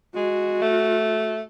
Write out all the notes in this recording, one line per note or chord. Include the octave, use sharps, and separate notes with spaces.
G#3 F#4
A3